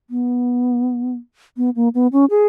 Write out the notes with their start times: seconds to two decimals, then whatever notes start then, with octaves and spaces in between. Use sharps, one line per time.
0.10 B3
1.57 B3
1.76 A#3
1.94 B3
2.12 C#4
2.30 G#4